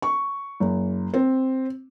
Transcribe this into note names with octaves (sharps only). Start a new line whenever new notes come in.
C#6
F#1
C4